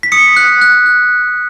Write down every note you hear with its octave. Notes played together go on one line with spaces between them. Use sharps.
B6
D#6 C#7
F#6
F#6
F#6